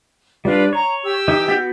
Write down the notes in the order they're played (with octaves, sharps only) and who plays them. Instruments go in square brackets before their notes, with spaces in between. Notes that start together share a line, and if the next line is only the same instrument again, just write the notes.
[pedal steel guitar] G3 D4 [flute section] F4 B4 D5
[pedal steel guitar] C#5 [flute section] A#5
[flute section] G4 E6
[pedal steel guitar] E3 D#4
B3 F#4 G6